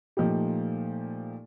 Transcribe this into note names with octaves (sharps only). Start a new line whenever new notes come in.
A#2 F3 A3 D#4 G4